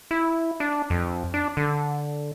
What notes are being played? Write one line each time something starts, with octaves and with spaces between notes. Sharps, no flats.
E4
D4
F2
D4
D3